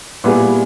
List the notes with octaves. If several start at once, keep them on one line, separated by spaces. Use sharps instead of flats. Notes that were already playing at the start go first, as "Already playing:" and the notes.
A#2 G3 B3 E4 G#4